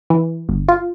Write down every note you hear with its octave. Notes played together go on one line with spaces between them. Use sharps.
E3
G1
F4